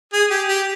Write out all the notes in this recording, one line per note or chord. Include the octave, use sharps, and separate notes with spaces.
G#4
G4
G4